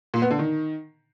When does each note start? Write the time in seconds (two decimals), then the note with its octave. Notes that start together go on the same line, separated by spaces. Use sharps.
0.14 A#2
0.22 B3
0.30 D3
0.39 D#3